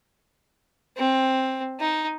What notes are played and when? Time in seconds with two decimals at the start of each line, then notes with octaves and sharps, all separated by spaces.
0.97 C4
1.80 D#4